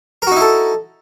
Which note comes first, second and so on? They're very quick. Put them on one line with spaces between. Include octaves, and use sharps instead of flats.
A#4 F#4 D#4 E4 A4